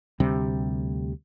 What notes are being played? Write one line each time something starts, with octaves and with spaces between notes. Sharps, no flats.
D2 C3 G3